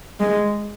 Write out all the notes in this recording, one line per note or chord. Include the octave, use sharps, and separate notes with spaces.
G#3